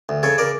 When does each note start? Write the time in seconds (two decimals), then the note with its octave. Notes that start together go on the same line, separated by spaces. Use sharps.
0.09 D2
0.23 C#3 A4 C#5
0.38 A#4 D5